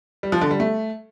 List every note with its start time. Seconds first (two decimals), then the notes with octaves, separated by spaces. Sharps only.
0.23 G3
0.32 F3
0.41 D3
0.51 G3
0.60 A3